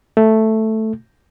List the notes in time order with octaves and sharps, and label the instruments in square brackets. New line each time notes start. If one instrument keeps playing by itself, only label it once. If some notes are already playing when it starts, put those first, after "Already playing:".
[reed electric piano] A3